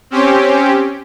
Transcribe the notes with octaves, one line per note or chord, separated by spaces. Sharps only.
C4 C#4 G4